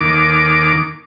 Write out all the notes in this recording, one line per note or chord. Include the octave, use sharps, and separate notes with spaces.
D#2 D6